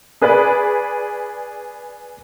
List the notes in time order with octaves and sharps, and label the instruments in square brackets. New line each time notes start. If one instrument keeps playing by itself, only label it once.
[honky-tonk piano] G#4 B4 D5 B5